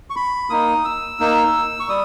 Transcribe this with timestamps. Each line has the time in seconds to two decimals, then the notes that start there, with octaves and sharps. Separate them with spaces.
0.10 C#6
0.16 B5
0.50 A#3 D#4 D#6
0.85 E6
1.20 A#3 D#4
1.80 C#6
1.88 G3 D#6